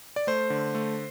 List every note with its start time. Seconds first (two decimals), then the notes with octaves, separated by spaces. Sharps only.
0.16 D5
0.27 A3 C5
0.50 D3
0.75 A3